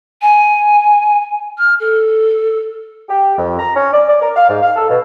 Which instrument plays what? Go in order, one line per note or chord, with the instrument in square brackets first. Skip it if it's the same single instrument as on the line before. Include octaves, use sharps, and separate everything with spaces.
[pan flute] G#5
F6
A4
[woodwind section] G4
F2
A#5
C#4
D5
D5
A#4
F5
G#2
F5
A4
B2